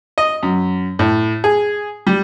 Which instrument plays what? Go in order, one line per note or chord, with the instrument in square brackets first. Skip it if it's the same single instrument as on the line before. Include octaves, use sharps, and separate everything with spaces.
[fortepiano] D#5
F#2
A2
G#4
G3